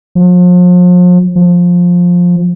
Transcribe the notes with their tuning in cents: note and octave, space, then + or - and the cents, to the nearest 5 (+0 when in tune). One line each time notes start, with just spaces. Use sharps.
F3 +40
F3 +15